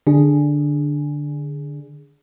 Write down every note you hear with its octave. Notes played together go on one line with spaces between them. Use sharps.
D3 D4 G#4